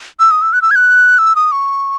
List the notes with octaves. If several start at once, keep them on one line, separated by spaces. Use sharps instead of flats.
E6
D#6
E6
F#6
E6
G#6
F#6
E6
D#6
C#6